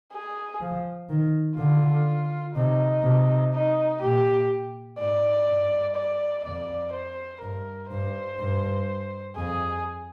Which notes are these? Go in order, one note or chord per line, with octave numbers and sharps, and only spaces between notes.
G#4
F3
D#3
D3 F4
C3 D#4
C3
D#4
A#2 G4
G#2 D5
G2
D5
F2 D5
C5
G2 A#4
G2 C5
G2
F2 G#4